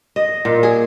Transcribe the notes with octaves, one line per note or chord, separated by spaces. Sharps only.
D#5
A#2
G#4